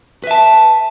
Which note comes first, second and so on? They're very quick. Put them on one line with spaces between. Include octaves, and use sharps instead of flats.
B4 E5 A5